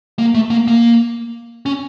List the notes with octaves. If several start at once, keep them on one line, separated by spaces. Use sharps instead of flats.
A#3
A3
A#3
A#3
C#4